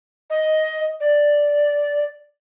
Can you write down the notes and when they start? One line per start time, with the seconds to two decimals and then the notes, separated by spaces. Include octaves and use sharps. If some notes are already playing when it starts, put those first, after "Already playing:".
0.30 D#5
1.00 D5